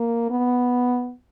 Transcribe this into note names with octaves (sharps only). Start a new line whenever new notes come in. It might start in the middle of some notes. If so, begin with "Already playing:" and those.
Already playing: A#3
B3